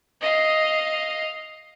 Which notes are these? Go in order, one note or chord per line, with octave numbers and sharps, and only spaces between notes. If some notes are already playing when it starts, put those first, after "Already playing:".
D#5 F5